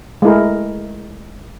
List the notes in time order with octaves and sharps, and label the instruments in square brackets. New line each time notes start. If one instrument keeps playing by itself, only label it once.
[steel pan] G#3 A3 E4 A#4